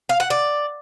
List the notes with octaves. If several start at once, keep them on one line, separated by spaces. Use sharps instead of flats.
F5
F#5
D5